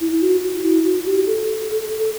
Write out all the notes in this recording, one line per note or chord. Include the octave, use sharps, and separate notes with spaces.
E4
E4
F#4
F#4
E4
F#4
G4
A4
A4